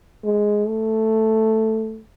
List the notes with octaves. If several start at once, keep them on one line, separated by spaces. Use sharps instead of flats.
G#3
A3